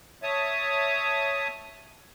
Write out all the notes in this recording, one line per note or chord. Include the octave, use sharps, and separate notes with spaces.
C#5 E5 A5 D#6